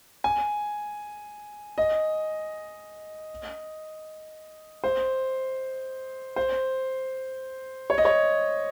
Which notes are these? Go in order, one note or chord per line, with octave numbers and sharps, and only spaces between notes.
G#5
D#5
C5
C5
C#5
D#5
C#5